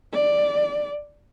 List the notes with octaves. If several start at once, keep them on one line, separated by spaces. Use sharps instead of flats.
D5